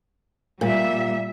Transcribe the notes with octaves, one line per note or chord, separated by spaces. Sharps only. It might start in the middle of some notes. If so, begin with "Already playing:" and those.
A#2 G3 E5